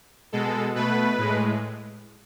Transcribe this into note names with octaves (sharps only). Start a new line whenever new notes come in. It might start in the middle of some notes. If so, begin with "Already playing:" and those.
B2 G#3 A4
B2 A3 B4
A2 G#3